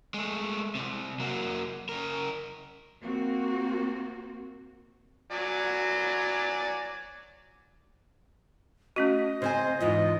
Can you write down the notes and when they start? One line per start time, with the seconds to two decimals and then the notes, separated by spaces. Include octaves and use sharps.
0.14 G#3 A3
0.75 C2 C3
1.20 F#3 A#3
1.89 C#3 A#4
3.02 A#3 C4 F#4
5.31 F#3 D5 G#5
8.96 A3 C#4 F#4 D#5
9.42 C#3 C4 C5 G#5
9.80 E2 G#2 E3 F4 D#5